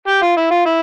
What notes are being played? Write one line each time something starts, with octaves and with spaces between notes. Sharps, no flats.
G4
F4
E4
F4
E4